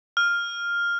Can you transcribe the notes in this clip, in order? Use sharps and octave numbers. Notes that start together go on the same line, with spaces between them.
F6